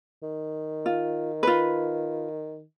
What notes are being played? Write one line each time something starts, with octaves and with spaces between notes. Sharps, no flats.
D#3
F4
F4 B4